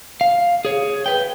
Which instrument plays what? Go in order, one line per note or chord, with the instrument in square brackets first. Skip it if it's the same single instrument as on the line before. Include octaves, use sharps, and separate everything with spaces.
[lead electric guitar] F5
G#4 C#5
B4 G5